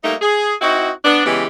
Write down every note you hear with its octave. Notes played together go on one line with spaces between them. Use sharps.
G3 A3 A#3 D#4
G#4
C4 D#4 E4 F#4
B3 D4
C#3 E3 G#3 B3 G4